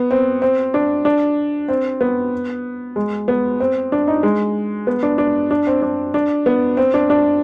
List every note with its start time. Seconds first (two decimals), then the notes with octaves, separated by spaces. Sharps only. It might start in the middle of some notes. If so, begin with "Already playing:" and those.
Already playing: B3
0.11 C4
0.42 C4
0.74 D4
1.05 D4
1.68 C4
2.01 B3
2.96 G#3
3.28 B3
3.60 C4
3.92 D4
4.08 D#4
4.23 G#3
4.87 B3
5.03 D4
5.18 D4
5.51 D4
5.67 C4
5.82 D4
6.14 D4
6.46 B3
6.77 C4
6.94 D4
7.10 D4